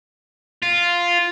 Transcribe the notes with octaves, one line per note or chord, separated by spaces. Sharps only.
F4